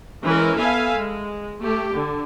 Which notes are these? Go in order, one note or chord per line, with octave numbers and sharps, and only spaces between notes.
E3 G#3 C#4 E4 A#4 B4
B3 A4 B4 E5 F5 G#5
G#3
A3 G4
D3